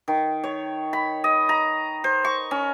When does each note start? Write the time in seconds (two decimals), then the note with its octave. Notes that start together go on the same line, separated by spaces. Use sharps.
0.08 D#3
0.44 C#5
0.93 B5
1.24 D#5
1.49 A#5
2.04 C5
2.25 C#6
2.51 C#4